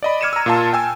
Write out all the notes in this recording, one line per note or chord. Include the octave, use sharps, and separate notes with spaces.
D5 D#5 B5
D6 F6 G#6 C#7 D#7 E7
A#5 E6
A#2 F4 A5
G5 G#5 E6